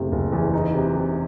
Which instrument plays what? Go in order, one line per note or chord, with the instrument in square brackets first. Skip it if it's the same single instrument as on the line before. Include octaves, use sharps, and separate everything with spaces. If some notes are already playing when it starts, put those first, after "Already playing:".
Already playing: [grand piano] F#1 C3 A3
F#1
E2
D#4
C3
C3